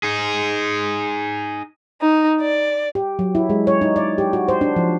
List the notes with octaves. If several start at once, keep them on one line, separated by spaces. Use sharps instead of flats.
D#4 G#4
D#4
D5
G4
F#3
E4
G#3
C#5
D#4
D5
G4
F#4
C5
D4
F3